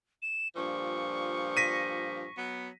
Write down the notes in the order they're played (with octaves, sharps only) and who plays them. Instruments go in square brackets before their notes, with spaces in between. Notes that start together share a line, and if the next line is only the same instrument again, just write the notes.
[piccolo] E7
[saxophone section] G2 A#2 F3 [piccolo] C#6
[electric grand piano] A#6 B6 D#7
[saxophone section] F#3 B3